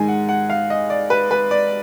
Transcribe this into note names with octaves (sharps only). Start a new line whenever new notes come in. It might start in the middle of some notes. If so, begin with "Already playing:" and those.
Already playing: G#2 D#3 G#3 G#5
F#5
F#5
F5
D#5
D5
B4
B4
D5